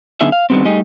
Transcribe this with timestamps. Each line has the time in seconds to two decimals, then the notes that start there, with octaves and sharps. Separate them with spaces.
0.21 F#2 D3 B3 D#4 G#4 E5
0.32 F5
0.50 D3 D#3 F3 G3 B3 C4
0.65 G3 A3 D#4 G4 G#4 D#5